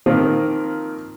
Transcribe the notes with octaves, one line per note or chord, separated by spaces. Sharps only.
D#3 F3 A#3 C4 F4